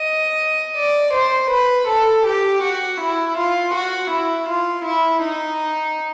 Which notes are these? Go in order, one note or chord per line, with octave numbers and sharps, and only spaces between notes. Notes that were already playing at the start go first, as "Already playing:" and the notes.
Already playing: D#5
D5
C5
B4
A4
G4
F#4
E4
F4
F#4
E4
F4
E4
D#4